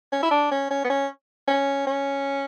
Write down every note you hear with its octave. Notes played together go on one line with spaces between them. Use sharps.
C#4
E4
D4
C#4
C#4
B3
C#4
C#4
C#4